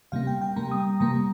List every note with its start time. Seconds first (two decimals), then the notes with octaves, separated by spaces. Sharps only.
0.12 C3 G3 A#3 F5
0.27 G5
0.41 G5
0.56 C3 G3 A#3 A#5
0.71 D#6
1.00 C3 G3 A#3 A#5